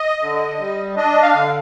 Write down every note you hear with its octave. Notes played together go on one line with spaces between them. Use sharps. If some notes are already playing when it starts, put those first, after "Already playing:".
Already playing: D#5
D3
G3
D4 D#5
F5
D3